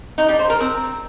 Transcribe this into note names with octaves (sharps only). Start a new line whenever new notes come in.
D#4
G3
C5
A#4
C4